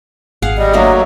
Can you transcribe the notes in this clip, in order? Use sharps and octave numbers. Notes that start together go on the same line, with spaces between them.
G#1 G#4 F5 F#5
G3 D#5
F#3 A3 A#3 D4